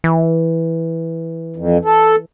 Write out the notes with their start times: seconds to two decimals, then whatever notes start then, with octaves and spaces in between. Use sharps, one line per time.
0.04 E3
1.56 F2
1.85 A4